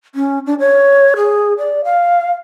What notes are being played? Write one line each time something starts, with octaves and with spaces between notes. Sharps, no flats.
C#4
D4
C#5
G#4
D5
F5